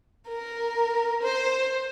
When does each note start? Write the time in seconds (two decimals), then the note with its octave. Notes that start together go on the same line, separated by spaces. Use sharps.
0.28 A#4
1.23 C5